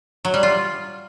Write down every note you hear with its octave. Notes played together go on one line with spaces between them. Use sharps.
F#3
G3
F4